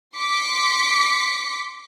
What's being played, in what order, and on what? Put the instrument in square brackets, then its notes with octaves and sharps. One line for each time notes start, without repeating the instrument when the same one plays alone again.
[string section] C6 D6 B6 C#7